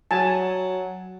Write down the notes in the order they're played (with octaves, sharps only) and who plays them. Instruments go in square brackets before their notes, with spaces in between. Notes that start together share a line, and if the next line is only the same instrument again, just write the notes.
[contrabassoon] F#3 [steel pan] G#5 A5